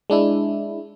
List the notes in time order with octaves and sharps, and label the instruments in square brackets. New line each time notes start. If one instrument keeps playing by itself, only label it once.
[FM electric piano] G#3 D4 E4